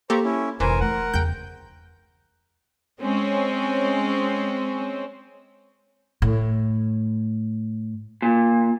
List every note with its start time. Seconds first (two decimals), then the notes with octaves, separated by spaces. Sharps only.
0.10 A#3 G4 A4 C5 A#5 C#6
0.24 C#4 E4
0.60 F1 A#2 E3 A#4 C5 G#5
0.80 A3 A#4 F#5
1.14 E2 C#3 G5 G6
3.01 G#3 C4 C#4
6.22 A2
8.22 A#2